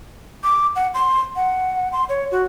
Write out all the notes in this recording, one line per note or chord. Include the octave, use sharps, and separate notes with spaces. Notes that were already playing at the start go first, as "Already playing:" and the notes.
D6
F#5
C6
F#5
C6
C#5
F#4